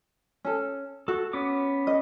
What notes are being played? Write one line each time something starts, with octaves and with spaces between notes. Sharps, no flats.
C#4 A4
F#4 A4
B3 C#4 D6
D#5